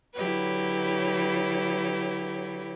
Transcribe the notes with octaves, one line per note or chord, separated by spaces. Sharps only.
D3 F#3 E4 G4 B4 C#5